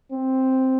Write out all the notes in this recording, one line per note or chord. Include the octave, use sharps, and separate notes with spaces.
C4